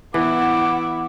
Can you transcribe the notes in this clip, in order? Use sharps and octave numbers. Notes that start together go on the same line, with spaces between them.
E3 B3 E4 F#5 D6